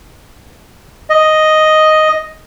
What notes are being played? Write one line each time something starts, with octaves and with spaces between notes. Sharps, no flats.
D#5